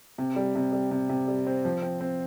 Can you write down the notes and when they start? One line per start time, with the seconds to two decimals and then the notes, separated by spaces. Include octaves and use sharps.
0.18 C3
0.36 G3
0.55 C3
0.72 G3
0.91 C3
1.09 C3
1.28 G3
1.47 C4
1.65 F3
1.82 C4
2.01 C4